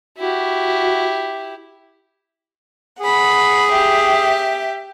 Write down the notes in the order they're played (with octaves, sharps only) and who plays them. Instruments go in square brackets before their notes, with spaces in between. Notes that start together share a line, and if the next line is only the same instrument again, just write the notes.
[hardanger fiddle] E4 G4 [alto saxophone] F#4
[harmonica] G#4 [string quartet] F#5 B5
[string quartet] G4 E5